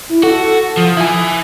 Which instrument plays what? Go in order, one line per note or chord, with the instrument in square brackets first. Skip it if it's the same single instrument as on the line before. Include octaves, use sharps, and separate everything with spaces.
[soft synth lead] E4
[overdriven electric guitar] F#4 [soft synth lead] A4
[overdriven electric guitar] F3 [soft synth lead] D#6
[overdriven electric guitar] E4 G#5